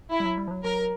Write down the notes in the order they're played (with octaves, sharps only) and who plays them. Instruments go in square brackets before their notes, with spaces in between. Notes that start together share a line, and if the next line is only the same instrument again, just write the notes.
[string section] E4
[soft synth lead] G3
F#3
G3
F3
F#3
[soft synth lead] F#3 [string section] A#4